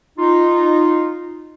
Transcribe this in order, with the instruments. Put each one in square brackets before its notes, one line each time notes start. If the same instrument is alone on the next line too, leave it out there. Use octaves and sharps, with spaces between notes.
[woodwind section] D#4 F4